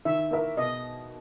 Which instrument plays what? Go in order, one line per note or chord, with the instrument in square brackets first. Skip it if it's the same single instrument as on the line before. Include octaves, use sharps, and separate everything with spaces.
[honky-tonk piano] D#3 [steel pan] E5
[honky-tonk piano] A#3 E4 A#4 E5
[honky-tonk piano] B2 [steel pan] D#5